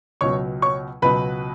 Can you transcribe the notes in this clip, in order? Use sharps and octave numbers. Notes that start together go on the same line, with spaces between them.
C#2 B2 F#3 C#5 C#6
C#5 C#6
C#2 B2 F#3 B4 B5